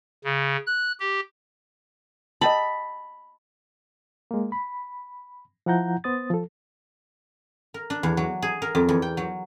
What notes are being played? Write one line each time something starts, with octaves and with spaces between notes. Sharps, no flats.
C#3
F#6
G4
D#5 G5 A5 B5
G#3 A#3
B5
F3 E4 F#5 A#5 G6
B3 C5 D#6 A6
F3 A4
A#4
D4
E2
F#3
G#4
A#4
F2
E2
G5
F#3